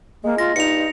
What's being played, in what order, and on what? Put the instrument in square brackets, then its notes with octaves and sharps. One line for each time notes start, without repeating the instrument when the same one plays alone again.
[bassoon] G#3 [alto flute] A#3
[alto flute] F4 [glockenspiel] A#6
[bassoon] G2 [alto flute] D#4 [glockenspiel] C#7 F7